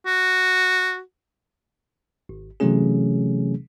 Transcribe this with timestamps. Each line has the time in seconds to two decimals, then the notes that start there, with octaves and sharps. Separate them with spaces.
0.06 F#4
2.29 G#1
2.60 C3 E3 F#3 A3 C#4 G#4